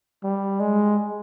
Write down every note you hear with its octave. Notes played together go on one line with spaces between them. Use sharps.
G3
G#3